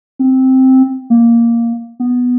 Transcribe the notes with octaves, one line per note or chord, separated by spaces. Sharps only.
C4
A#3
B3